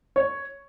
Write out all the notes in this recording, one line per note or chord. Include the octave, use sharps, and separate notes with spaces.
C#5